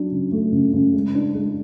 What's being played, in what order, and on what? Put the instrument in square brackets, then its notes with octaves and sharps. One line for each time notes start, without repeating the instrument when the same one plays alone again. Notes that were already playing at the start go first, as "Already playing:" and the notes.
Already playing: [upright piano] F#3 D4
C#3
A3
C#3
C#3
G#3
D4
G#3